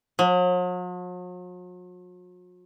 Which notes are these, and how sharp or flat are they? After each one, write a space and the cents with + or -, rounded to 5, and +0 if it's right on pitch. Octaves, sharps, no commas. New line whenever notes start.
F#3 -45